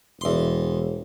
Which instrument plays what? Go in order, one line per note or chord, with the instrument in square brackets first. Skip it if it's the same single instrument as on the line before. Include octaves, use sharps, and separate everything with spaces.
[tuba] E1 [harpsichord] E2 C6